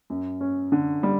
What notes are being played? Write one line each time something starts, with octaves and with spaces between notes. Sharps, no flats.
F#2
C#4
D3
G3